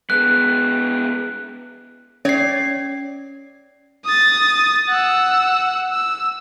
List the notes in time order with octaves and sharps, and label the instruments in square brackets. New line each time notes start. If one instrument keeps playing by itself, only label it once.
[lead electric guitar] G#3 B3 [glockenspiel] F#6
[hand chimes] C#4 C7 [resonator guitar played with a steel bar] C#5 D5
[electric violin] D#6 A6
F#5 E6
E6